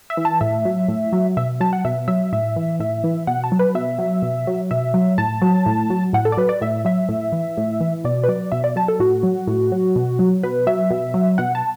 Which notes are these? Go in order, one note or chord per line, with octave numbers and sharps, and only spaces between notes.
E5
E3
A5
A2 E5
F#3
A2
F#3
B2 E5
F#3 A5
F#5
B2 E5
F#3 E5
A2 E5
E3
A2 E5
E3
B2 F#5
A5
F#3
B4
B2 E5
F#3
B2
F#3
B2 E5
F#3
A2 A5
F#3
A2
F#3
A2 F#5
A4
D5
F#3 B4
D5
A2 E5
F#3 E5
A2
E3
A2
E3
B2 D5
B4
F#3 D5
B2 E5
D5
F#3 A5
A4
A2 F#4
F#3
A2
F#3
B2
F#3
B2 B4
F#3 E5
B2
F#3
B2 F#5
A5